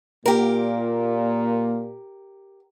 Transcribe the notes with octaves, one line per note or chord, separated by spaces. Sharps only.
A#2 A#3 G4 A#4